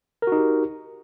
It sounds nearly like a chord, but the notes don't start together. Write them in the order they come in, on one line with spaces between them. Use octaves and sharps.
A#4 F#4 D#4 G4